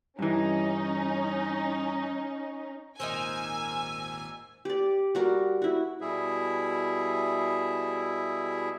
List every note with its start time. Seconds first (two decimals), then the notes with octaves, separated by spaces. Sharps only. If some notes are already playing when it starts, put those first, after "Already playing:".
0.19 G2 E3 C#4 D#4
3.00 G#1 D#2 A#2 D#4 A#4 C5 G#5 E6
4.65 G4 D5
5.15 G3 F#4 A#4
5.62 E4 F#4
6.01 B2 G3 E4 G#4 E5